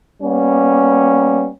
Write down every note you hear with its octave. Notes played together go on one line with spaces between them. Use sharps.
G3 A#3 B3 C#4